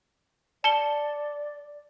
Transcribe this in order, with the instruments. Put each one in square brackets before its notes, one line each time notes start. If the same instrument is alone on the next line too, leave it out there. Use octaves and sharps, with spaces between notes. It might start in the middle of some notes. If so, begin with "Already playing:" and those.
[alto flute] D5 [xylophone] A5 C#7 G7